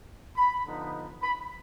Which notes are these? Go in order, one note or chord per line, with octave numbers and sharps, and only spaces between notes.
B5
D3 F3 B3 D#4
B5